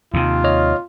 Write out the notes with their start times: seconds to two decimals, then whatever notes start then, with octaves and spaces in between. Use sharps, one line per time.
0.14 D#2 C3 F4
0.44 C#5 D#5 F6